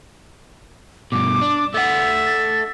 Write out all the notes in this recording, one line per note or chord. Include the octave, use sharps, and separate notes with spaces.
G2 B2 D6
D4
A3 E5 F#5 A6
A6